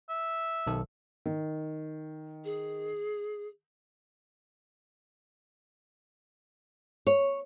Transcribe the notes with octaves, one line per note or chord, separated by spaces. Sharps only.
E5
B1 D#3 A4
D#3
G#4
C#5